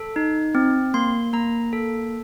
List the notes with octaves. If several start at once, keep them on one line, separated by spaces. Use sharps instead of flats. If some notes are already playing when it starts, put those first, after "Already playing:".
Already playing: A4
D#4
C4
A#3 C6
A#3 A#5
A4